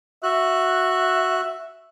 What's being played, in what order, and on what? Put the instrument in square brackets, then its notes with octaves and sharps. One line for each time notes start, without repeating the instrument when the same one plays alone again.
[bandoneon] F#4 F#6 [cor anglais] E5